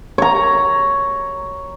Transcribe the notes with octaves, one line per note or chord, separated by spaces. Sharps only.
C#5 A#5